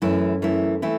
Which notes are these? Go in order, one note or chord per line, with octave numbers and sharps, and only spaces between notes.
F#2 E3 A3 E4
F#2 E3 A3 E4
E3 A3 E4